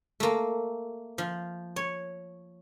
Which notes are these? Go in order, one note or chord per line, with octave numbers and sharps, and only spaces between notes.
A3 A#3
F3
C#5